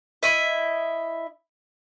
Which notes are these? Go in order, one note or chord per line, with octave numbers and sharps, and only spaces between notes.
E4 D#5 E5